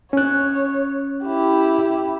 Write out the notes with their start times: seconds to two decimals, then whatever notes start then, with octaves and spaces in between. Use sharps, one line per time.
0.13 C#4 C#5 F#6
1.24 E4 G4